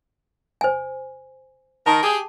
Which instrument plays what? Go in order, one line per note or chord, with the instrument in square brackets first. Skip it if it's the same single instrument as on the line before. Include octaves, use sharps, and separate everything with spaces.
[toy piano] C5 G#5
[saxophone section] D#3 A#4 [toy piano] A5
[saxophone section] G4 G#4